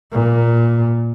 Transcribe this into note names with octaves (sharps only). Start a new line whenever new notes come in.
A#2